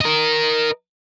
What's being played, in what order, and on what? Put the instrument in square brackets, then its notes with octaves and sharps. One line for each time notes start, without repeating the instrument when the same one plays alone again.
[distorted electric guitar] A#4 D#5